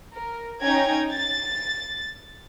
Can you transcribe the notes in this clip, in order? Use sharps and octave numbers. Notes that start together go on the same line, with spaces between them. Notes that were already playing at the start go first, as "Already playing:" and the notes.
A#4
C#4 D#4 G5 A#5 G#6
A6